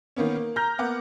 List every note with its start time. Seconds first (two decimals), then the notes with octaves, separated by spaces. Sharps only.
0.16 D#3 A#3 B3 C#4
0.36 A#3
0.56 A#5 F6 G6 A#6
0.78 A#3 B3 F#5 D6